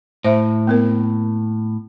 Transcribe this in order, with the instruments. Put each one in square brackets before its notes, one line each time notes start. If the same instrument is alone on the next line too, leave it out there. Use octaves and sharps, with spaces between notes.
[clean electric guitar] A2 [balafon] C5 E5
[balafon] A#3 B3 A#4